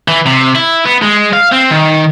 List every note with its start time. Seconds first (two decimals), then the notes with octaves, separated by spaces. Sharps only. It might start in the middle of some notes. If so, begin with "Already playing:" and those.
0.08 E3
0.26 C3
0.55 E4
0.86 B3
1.03 G#3
1.33 F5
1.52 C4
1.71 D#3